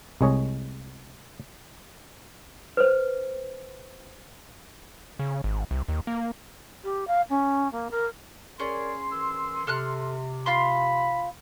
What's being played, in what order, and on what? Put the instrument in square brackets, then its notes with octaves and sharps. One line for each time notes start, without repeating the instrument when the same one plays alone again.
[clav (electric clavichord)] C2 G#3 G#4 C#5 D#5
[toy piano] B4 C5
[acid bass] C#3
G#1
C2
D#2
A#3
[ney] G4
F5
C#4
A#3
A#4
[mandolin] C#4 G#4 [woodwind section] A#4 D5 [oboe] C6
[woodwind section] E3 A#4 E6
[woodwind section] C3 [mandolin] A4 F6 F#6
[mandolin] F4 F5 C6 [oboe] B5